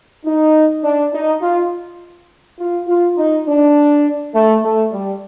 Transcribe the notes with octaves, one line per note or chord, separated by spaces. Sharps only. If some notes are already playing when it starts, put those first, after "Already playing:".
D#4
D4
D#4
F4
F4
F4
D#4
D4
A3
A3
G3